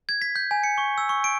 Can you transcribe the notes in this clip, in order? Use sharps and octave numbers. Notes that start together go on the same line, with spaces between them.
G#6
B6
G6
G#5
C#7
C#6
E6
C#6
D7